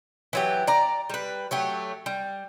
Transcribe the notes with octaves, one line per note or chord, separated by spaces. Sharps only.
E3 F#3 G4
D5 A#5
G3 B4
F#3 A3 G4
G3